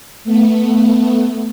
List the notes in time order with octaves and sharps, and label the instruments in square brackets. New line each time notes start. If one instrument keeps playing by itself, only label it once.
[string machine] A3 B3